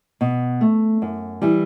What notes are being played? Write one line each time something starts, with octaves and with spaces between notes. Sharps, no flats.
B2
A3
F#2
E3 G3